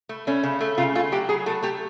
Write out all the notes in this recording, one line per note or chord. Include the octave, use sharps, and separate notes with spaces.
A3
A3 C#4
C#3
A3
C#3 F4
A3 F4
F#3 G4
F#3 G#4
A3 A4
A3 G4